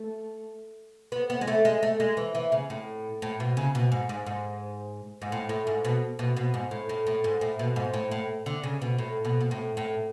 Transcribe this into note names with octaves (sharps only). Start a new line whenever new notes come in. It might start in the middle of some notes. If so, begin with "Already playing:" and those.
Already playing: A3
B3
B3
G#3
A3
G#3
A3
G#3
E3
E3
C#3
A2
A2
B2
C#3
B2
G#2
G#2
G#2
G#2
A2
A2
G#2
B2
B2
B2
G#2
A2
A2
A2
G#2
A2
B2
G#2
A2
A2
D3
C#3
B2
A2
B2
B2
A2
A2